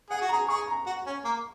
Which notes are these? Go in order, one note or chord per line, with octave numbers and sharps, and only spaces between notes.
G#4 F#5
F#4
A#5
G#4
G#4 C#6
A#5
F#4
C#4
A#3